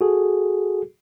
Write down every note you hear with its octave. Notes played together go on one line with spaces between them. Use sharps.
F#4 G#4 A4